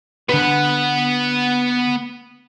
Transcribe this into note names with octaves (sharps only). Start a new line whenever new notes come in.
D3 B3 B4 F#5